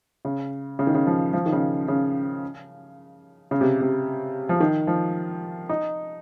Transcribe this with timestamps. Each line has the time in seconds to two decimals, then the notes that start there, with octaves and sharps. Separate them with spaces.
0.25 C#3
0.79 C#3
0.87 D#3
0.95 C#3
1.07 F3
1.33 F3
1.46 D#3
1.52 C#3
1.88 C#3
3.51 C#3
3.61 C3
3.81 C3
4.49 F3
4.60 D#3
4.87 F3
5.69 D#4